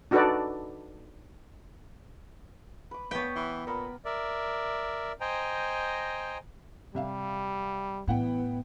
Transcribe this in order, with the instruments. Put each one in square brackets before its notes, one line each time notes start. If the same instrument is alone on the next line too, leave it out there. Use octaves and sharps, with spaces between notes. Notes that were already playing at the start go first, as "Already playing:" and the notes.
[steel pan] D4 D#4 F#4 A4 B4 D5
[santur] B4 D6
[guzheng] B3 G5 [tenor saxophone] B4 [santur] C#5 D5 A5
[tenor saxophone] E3 [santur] B5 D6
[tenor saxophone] A#2 [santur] A#4 B4 B5
[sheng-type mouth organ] A#4 D5 E5
C5 D#5 G5 G#5 A#5
[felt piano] C3 E5 F5 [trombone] G3
[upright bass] A2 [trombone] E3 [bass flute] B3 [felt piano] E4 F#5 G5